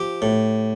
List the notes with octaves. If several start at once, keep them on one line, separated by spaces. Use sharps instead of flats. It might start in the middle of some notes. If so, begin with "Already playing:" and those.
Already playing: F3 G4
A2